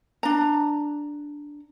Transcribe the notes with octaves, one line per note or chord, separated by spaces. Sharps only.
D4 A#5